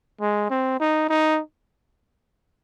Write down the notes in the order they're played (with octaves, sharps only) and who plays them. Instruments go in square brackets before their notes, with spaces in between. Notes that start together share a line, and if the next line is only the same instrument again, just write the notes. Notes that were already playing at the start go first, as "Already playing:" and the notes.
[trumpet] G#3
C4
D#4
D#4